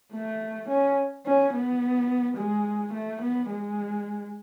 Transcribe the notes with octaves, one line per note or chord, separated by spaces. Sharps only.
A3
C#4
C#4
B3
G#3
A3
B3
G#3